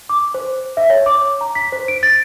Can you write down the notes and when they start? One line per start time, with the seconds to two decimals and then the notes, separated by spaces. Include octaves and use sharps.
0.09 D6
0.34 C5
0.77 E5
0.90 C#5
1.06 D6
1.41 A#5
1.55 B6
1.72 C5
1.88 D7
2.03 A6